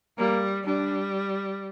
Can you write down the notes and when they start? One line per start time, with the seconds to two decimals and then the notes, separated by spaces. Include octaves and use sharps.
0.18 G3 A#3
0.65 G3 D4